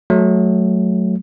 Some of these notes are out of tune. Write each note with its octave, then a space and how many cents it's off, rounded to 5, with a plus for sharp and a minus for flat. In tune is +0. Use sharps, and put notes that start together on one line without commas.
F#3 +0 A3 -20